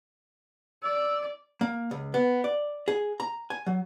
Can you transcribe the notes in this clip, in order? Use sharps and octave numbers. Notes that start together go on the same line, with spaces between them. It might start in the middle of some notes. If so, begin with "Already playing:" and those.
D5 E6
A#3
C#2
B3
D5
G#4
A#5
G#5
F#3